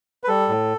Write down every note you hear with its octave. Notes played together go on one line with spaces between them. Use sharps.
B4
G3 A4
A2